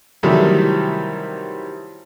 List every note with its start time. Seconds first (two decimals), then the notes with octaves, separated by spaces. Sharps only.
0.23 C3 D#3 E3 F#3 G3 A3